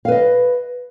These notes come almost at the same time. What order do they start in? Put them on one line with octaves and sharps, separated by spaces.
F5 B4 D#5